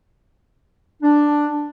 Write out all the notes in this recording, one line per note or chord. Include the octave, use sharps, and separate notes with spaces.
D4